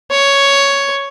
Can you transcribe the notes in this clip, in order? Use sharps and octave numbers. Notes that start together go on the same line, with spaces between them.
C#5